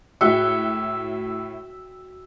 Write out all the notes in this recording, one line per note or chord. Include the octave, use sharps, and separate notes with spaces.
A2 E4 F#4 E5 G5 G7